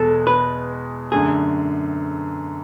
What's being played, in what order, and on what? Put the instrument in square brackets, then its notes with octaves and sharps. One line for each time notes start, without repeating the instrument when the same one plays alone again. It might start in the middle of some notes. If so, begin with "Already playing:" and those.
Already playing: [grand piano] E2 B2 G#3 [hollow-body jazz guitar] A4
[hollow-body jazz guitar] B4
[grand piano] F#2 D3 A3 [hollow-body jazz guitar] G#4